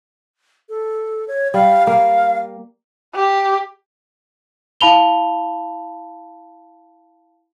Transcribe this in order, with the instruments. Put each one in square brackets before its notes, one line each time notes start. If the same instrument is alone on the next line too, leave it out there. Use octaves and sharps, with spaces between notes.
[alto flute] A4
C#5
[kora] G3 [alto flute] F5
[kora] A#3 [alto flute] F5
[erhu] G4
[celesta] E4 F5 A5 B5 F7 G7